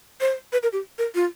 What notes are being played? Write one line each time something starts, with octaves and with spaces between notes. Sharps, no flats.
C5
B4
A#4
G4
A#4
F4